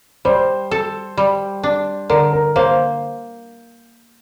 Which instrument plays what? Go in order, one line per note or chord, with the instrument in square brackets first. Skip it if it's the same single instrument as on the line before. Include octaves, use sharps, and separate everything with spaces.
[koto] G3 [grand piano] C5
[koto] A4
G3
D4
[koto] D3 [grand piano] A#4
[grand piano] A#4
[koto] A#3 [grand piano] C5